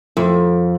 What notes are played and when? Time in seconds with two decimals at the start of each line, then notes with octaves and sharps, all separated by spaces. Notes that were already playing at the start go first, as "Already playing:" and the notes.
0.17 F2